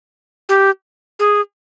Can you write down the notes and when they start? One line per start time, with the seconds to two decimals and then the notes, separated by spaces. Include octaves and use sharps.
0.49 G4
1.19 G#4